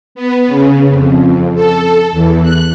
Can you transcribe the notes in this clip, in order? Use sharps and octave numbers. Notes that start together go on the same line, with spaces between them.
B3
C#3
F2
A4
E2
F#6